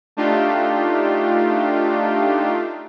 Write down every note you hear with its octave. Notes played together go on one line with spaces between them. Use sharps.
A3 D4 D#4 F4 G4